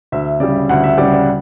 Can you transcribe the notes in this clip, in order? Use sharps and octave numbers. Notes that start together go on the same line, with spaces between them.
D2 E5
C#3 G3 D5
D2 F#5
E5
C#3 G3 D5
D5